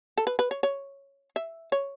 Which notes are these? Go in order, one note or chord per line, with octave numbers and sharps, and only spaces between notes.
A4
B4
B4
C#5
C#5
E5
C#5